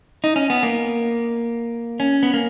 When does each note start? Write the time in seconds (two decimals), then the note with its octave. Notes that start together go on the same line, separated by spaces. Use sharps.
0.24 D#4
0.36 C#4
0.50 B3
0.63 A#3
2.00 C#4
2.23 B3
2.34 A#3